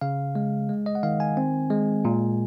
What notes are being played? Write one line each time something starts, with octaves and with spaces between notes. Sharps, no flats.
C#3 F5
G#3
G#3
D#5
F#5
D#3 F5
G#5
C4
G#3
A#2